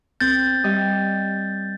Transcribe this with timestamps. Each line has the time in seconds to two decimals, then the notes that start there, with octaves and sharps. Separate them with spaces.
0.21 C4 G6 A6
0.64 G3 D#5